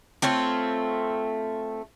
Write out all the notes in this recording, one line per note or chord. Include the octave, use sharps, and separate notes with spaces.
A3 C4 F4 C#5